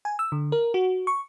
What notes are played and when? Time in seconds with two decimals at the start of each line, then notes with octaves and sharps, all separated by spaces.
0.05 G#5
0.19 E6
0.32 D3
0.52 A#4
0.74 F#4
1.07 C#6